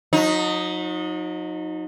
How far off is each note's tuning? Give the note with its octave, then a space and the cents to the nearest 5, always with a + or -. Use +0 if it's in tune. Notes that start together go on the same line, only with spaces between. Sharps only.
F#3 -40 D#4 +0